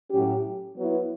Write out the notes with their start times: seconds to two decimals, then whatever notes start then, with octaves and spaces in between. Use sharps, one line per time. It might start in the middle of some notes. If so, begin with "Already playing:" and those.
0.11 A2 F#3 C#4 G4
0.76 F#3 B3 E4